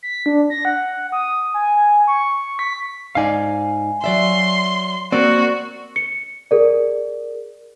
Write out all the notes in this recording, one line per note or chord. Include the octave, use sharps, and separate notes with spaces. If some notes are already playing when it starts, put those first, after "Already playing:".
B6
D4
A#6
F#5
D#6
G#5
C#6
B6
G#2 D#4 D5 F5 G#5
F#3 D5 E5 C6
A#3 C4 F#4 D5
C#7
G#4 A#4 D5